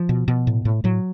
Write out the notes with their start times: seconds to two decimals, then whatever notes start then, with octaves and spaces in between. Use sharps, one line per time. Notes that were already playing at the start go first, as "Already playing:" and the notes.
Already playing: F3
0.09 B2
0.28 B2
0.47 A2
0.65 A2
0.84 A2 F#3